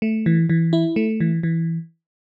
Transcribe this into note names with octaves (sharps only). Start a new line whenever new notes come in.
A3
E3
E3
E4
A3
E3
E3